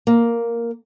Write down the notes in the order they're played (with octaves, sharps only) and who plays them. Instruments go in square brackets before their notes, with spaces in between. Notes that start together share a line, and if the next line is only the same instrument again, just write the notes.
[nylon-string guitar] A#3